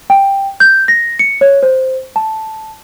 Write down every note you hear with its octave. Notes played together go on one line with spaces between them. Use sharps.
G5
G6
A#6
C#7
C#5
C5
A5